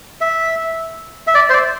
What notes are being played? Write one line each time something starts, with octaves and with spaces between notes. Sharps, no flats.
E5
E5
D5
C5
D5